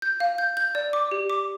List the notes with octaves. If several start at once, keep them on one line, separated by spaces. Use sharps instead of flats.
G6
F5
G6
G6
D5
D6
G4
D6